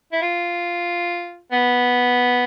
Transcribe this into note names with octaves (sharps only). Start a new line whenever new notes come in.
E4
F4
B3